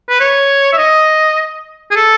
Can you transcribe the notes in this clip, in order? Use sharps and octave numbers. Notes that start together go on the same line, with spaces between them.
B4
C#5
E5
D#5
G#4
A4